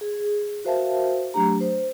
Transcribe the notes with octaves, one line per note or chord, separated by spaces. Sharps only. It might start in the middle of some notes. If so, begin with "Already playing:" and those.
G#4
F#4 A#4 C5 E5 F5 A5
F#3 A3 D4 G4 A#5
C5